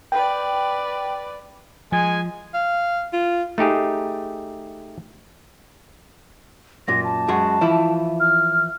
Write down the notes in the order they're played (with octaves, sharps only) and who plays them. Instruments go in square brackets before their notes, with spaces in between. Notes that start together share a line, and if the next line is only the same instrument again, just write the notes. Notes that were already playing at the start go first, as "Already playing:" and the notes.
[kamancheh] B4 D5 [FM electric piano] G5
[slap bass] F3 [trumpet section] G#3 G#5
[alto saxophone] F5
F4
[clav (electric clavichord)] A3 D#4 G4 G#4
[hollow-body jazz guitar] F#2 A#2 [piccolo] A#6
[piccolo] A5
[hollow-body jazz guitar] F#2 G#3 F#4
E3 F3 E4
[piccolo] F6